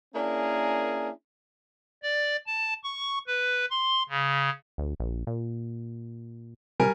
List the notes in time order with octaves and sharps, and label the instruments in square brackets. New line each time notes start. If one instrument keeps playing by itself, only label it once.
[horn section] A#3 C#4 D4 E4 G#4 A#4
[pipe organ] D5
A5
C#6
B4
C6
C#3
[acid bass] D2
A#1
A#2
[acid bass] C3 [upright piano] G3 A#4 G#5